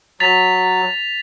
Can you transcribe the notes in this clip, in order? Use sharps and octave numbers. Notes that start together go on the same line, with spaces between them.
F#3 A6 B6 F7